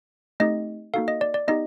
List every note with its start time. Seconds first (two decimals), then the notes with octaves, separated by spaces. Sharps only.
0.40 A3 C4 D#4 G4 D#5
0.94 A#3 D#4 F#4 A4 F5
1.08 D#5
1.21 D5
1.34 D5
1.48 B3 D#4 G4 D#5